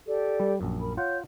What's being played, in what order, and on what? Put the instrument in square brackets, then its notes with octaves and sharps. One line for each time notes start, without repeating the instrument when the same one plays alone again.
[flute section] G4 A4 D5
[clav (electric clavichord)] G3
A#1 F#2
[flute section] A#4 B5
[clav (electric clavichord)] F4 F#5 [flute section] C#5 G6